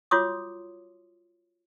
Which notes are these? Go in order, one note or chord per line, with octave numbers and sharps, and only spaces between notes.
F4 F#4 C#5 C6 D6 D#6